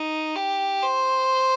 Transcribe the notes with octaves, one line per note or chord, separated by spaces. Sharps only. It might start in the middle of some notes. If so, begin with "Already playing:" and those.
Already playing: D#4
G4
C5